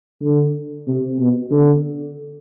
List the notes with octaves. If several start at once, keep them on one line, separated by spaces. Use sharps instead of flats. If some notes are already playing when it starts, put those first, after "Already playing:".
D3
C3
B2
D3